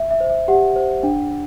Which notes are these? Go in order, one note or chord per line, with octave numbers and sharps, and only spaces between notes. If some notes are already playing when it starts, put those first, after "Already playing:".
Already playing: E5
E5
C5
E5
G4 F#5
C5
D4